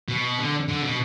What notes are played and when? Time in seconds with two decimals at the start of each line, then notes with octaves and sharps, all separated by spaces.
0.09 B2
0.39 D3
0.68 D3
0.83 B2